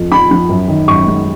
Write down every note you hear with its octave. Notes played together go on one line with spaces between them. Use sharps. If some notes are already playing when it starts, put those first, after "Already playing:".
Already playing: F2 F3
F3 B5
F3
F#2
D#3
F#2 C#6
G#3